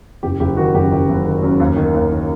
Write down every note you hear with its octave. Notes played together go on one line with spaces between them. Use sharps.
F#1 G4
F#1 G4
D#3 F#4
F#2 G4
F#1 G4
F#1
D#3
F#2
D#2
D#3
D#2
D#3